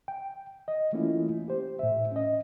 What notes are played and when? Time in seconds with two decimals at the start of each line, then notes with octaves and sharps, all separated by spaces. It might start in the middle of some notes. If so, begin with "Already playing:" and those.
0.08 G5
0.68 D#5
0.93 E3 A3 A#3 C#4 E4 F4
1.48 G4 C5
1.79 A2 E5
2.12 C#4 D#5